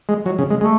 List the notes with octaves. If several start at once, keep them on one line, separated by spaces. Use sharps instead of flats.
G#3
F#3
C#3
G#3
G#3 A3